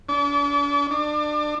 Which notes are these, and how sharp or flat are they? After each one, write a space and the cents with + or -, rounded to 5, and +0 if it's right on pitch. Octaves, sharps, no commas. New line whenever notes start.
D4 -40
D4 +30